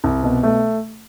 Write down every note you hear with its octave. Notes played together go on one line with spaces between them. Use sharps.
C2
B2
A3